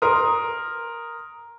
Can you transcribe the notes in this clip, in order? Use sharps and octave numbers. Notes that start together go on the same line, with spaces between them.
A#4 C6 D#6